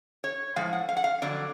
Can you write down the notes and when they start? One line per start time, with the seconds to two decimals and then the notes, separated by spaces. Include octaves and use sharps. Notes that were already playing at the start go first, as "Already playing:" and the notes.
0.24 C#5
0.56 A2 F3 G#3 F5
0.73 F#5
0.89 F5
0.97 F#5
1.04 F5
1.22 F2 D3 F#3 D5